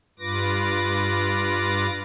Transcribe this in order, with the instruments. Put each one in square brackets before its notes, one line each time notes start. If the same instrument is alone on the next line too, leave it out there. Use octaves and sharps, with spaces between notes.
[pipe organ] G2 F4 B4 D6 A#6